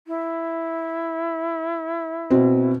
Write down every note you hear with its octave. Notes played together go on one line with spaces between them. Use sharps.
E4
B2 C4